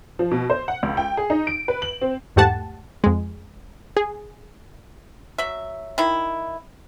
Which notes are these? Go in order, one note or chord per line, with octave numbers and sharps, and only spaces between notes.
F3
B2
C5
F#5
C#2
G5
G#4
D#4
D7
B4
F#7
C4
E2 G#2 A3 G4 F#5 A5
F2 G#3
G#4
F#3 E5
D#3 E4